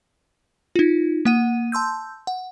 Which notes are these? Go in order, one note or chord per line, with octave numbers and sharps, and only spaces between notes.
D#4 F4
A#3 F#5 D#7
A5 C6 E6 G6
F#5